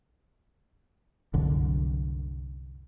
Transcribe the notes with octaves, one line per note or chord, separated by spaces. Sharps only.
C2 F#2 D3